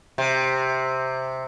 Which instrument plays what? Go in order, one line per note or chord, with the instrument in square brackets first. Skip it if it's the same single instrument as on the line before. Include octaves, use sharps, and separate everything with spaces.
[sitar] C3